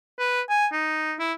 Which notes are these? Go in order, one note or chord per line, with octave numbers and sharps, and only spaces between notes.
B4
G#5
D#4
E4